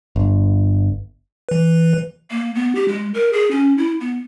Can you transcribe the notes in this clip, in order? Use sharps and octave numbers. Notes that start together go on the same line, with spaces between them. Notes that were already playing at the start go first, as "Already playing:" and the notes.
G1
E3 B4
A#3
B3
G4
G#3
A#4
G#4
C#4
E4
B3